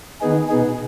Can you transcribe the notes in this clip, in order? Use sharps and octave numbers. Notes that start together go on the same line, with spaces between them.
D#3 B3 D#4 G#4
B2 B3 D#4 G#4